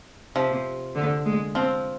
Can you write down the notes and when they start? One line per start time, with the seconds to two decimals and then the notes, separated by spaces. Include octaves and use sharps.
0.36 C3 F3
0.95 D3
1.25 G#3
1.55 F3 C4